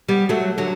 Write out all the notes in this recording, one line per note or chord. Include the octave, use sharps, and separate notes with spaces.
G3 B3
F#3 A3
D3 F#3